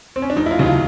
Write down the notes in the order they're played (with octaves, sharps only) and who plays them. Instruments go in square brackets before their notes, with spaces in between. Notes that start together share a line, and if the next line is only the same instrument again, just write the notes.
[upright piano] C4
C#4
D4
F1 D#4
E4
F4
D#2 C#3 F#3
F4